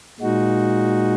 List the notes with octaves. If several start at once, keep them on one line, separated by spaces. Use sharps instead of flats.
A#2 G#3 D#4 F#4